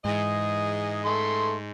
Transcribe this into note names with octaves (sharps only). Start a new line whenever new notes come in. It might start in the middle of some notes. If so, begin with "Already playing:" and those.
G#2 E3 G#4 D#5
A3 C6